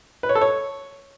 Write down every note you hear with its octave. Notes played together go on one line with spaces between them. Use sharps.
B4
C#5
A4
C#5